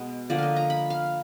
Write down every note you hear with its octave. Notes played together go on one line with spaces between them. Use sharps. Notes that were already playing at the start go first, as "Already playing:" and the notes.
Already playing: B2 G#3 B3
D3 F3 A#3 D5
D#5 F5
A#5
B5
F5